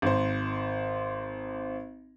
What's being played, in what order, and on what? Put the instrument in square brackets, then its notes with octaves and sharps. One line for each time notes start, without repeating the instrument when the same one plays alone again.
[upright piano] G#1 C5